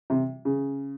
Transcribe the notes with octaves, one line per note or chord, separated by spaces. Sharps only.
C3
C#3